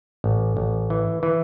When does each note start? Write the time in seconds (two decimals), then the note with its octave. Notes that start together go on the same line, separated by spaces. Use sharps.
0.24 A1
0.57 A1
0.90 E3
1.23 E3